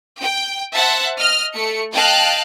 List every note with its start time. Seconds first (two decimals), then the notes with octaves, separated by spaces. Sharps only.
0.20 G5
0.75 C5 E5 F#5 A5
1.19 D#5 F6
1.54 A3 C#7
1.92 D#5 F5 G5 A5 F#6